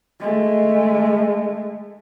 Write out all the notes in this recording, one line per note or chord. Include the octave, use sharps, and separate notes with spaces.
G#3 A3